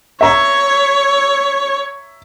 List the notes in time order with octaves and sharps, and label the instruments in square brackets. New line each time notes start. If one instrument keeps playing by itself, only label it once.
[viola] C#5 [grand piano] E5 A#5